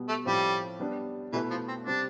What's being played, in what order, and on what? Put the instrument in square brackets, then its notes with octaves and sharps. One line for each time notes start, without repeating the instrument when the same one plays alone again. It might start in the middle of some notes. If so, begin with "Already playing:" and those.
Already playing: [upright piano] B2 G3 B3
[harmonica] A3
[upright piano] A2 F3 C4 [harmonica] G3
[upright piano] G3 B3 D4
[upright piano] B2 A3 E4 B4 [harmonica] E3
[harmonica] F3
C4
[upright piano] C3 G3 C4 [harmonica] D4